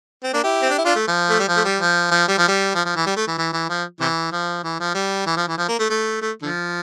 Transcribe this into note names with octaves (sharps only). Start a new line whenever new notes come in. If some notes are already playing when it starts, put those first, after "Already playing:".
C4
A#3 D4
E4 G4
C4
D4
E4
D4 F4
A3
F3
A3
G3
F3
A3
G3
F3
F3
G3
F3
G3
F3
F3
E3
G3
A3
E3
E3
E3
F3
C3 E3
F3
E3
F3
G3
E3
F3
E3
F3
A#3
A3
A3
A3
D3 F3